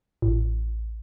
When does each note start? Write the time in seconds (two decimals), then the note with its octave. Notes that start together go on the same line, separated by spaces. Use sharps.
0.22 A1